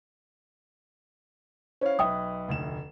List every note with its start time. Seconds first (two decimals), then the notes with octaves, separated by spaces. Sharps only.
1.81 C#4 E4 C5 C#5 F5
1.99 B1 B4 E5 G5 D#6
2.49 F1 D2 E7